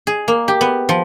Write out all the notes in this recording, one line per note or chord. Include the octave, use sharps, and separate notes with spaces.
G#4
A#3
G4
B3
F3